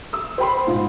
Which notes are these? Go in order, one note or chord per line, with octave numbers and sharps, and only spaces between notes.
D#6 E6
C5 G5 B5 C6
G#2 F4